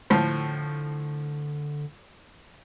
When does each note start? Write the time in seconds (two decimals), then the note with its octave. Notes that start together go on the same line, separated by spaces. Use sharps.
0.10 A2 D3 F3